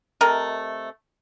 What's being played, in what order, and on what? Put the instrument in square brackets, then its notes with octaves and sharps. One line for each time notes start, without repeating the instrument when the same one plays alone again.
[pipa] C3 A3 A#4 D#5